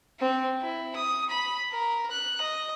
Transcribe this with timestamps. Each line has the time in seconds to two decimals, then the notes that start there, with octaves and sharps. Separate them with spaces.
0.20 C4
0.62 E4
0.95 D#6
1.30 B5
1.72 A#4
2.11 F#6
2.41 D#5